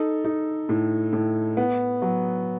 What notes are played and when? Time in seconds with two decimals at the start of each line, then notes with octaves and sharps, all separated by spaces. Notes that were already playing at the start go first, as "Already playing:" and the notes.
Already playing: D#4 A4
0.25 D#4
0.69 A2
1.13 A2
1.57 B3
2.02 F#3